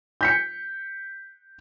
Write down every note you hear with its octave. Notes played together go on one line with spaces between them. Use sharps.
G6 B6 C#7